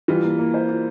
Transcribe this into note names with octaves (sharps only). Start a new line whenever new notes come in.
E3 G3 F4
A#3
A#3
C5
F4